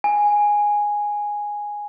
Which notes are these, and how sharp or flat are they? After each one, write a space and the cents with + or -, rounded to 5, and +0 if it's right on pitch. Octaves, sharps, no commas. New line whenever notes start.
G#5 -5